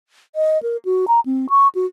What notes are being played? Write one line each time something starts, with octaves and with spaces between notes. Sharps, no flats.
D#5
A#4
F#4
A#5
C4
C#6
F#4